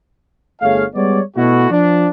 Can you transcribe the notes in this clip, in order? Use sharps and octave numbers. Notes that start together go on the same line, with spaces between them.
G1 A3 G#4 C#5 F5
G3 G#3 B3 C#5 D5
B2 A3 E4 F#4
F3 D4